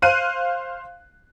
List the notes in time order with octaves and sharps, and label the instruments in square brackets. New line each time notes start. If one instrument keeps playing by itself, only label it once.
[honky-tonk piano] C5 F5 F#6 D#7